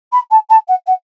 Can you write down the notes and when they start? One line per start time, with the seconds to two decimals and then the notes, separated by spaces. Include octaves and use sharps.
0.12 B5
0.30 A5
0.49 A5
0.67 F#5
0.86 F#5